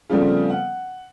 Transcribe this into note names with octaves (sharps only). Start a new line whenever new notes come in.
C#3 F3 G3 A3 B3 C4
F#5